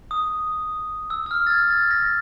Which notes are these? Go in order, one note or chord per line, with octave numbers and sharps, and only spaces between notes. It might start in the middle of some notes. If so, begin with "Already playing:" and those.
D#6
E6
E6
F6
A6
G#6
A6
A#6